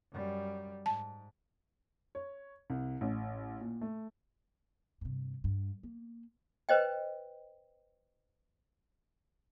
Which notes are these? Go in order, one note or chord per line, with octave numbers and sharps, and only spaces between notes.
F#2 G3
G#2 A5
C#5
C2
A1
A#2
A3
G2 C3
G2
A#3
B4 C5 D#5 G5